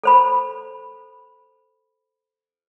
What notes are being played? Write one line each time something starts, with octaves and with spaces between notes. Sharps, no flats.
A4 C5 B5